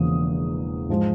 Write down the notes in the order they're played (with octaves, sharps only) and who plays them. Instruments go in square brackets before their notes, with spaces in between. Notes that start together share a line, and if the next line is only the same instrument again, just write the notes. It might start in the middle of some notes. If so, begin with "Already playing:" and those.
Already playing: [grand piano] E1 E2 C#3 F3 A#3 D#6
G#2 F3 G#3